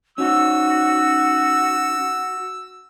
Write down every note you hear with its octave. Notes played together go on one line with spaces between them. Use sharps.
C#4 D#4 F#4 E6